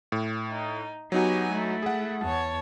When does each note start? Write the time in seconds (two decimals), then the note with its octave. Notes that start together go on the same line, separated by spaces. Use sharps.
0.12 A2
0.52 D#4
1.12 F#3 B3 D#4 F#4 G4 G#5
1.52 A3 E4
1.82 G#4 F#5
2.22 E2 C#5 A5